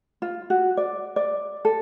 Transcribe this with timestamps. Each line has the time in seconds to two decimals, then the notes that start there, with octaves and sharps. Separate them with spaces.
0.22 F4
0.50 F#4
0.77 D5
1.16 D5
1.65 A4